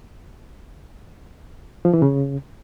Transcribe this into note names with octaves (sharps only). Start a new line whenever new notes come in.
F3
E3
C#3